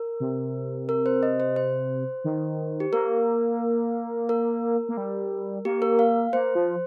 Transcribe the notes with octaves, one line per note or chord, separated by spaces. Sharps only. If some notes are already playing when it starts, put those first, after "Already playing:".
Already playing: A#4
C3
A#4
C5
D#5
C5
C5
D#3
G4
A#3 A#4
A#4
A#3
G3
A#3 G4
A#4
F5
A#3 C5
F3